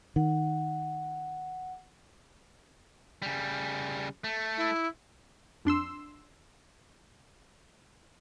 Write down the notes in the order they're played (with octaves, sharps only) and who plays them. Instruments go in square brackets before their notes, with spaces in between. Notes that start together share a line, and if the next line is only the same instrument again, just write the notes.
[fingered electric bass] D#3 [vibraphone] F#5
[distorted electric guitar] C#3 G3
A3
[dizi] E4
[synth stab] F2 D4 C6 E6